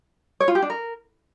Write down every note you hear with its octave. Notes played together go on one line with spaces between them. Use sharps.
C#5
F4
G4
D4
A#4